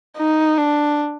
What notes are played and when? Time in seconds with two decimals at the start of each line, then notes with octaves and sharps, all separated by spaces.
0.18 D#4
0.58 D4